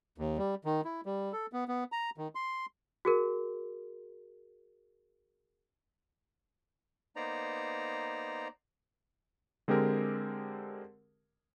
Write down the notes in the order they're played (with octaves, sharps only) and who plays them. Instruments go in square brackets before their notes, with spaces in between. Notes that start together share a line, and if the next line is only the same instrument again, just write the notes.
[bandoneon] D#2
G3
D#3
E4
G3
A4
B3
B3
A#5
D#3
C6
[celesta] F#4 G#4 A#4
[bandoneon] A#3 B3 D#4 C5 D5 A#5
[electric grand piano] D3 G#3 C4 G4 G#4 A#4